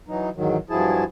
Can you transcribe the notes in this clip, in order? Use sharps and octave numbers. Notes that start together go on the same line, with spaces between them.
E3 F#3 D#4
E2 G#2 D#3 F#3
G2 F3 F#3 E4 G#4 A5